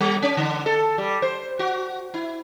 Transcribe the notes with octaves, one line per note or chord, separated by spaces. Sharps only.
G3
C#4
D3
A4
G3
C5
F#4
E4